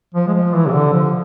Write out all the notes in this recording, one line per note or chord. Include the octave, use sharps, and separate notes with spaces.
F3
G#3
F3
E3
C3
D3
F3